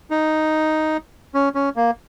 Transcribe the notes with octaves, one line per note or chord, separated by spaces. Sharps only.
D#4
C#4
C#4
A#3